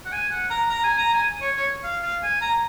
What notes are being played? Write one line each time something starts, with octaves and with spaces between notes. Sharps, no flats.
F#5
G#5
F#5
A#5
A#5
G#5
A#5
G#5
C#5
C#5
F5
F5
G#5
A#5